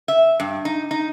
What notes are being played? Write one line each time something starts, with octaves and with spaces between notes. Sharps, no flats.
E5
G2
D#4
D#4